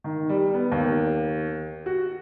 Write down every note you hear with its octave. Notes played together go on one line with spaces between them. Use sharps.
D#3
G3
B3
D#2
F#4